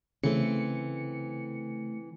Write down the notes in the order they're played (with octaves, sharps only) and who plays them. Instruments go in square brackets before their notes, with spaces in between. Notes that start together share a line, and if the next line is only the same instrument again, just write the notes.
[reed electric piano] C#3 [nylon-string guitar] E3 C4 [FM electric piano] A3 C#7